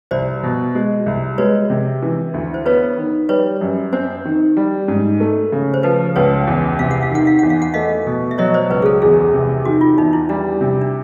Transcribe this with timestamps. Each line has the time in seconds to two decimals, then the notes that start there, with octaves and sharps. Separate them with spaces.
0.11 C2 C5 D5
0.43 B2
0.75 G#3
1.06 C2
1.38 G#3 B4 C#5
1.70 C3
2.03 E3
2.34 D2
2.54 C5
2.66 B3 B4 C#5
2.97 D#3
3.29 G3 B4 C#5
3.61 F#2
3.93 C4 C5
4.25 D#3
4.57 G3
4.88 G#2
5.20 A3
5.52 C#3
5.74 C5
5.83 F3 B4
6.16 C#2 B4 C#5
6.47 E2
6.79 C3 F5
6.91 F#5
7.03 F5
7.11 D#3 F#5
7.27 F5
7.39 E2 F#5
7.50 F5
7.62 F#5
7.74 A3 D#5 F5
8.07 B2
8.31 E5
8.38 F#3 C#5 D#5
8.54 C5 D5
8.70 C#2 B4 C#5
8.82 G#4
8.86 A4
9.02 E2 G#4
9.33 C3
9.65 D#3 F#4
9.81 F4
9.97 E2 D#4
10.13 E4
10.29 G3 D4
10.61 C3
10.81 D4